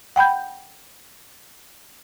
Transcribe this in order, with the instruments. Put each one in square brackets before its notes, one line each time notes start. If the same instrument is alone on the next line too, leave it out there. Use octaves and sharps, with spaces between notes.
[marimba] F#5 G5 B5 G6